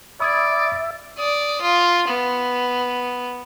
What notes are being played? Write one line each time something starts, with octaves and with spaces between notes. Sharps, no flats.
D5 E5 B5 D#6 G#6
D5 D#6
F4
B3